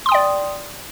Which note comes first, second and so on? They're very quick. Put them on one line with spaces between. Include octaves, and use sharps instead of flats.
C6 D#6 G5 D5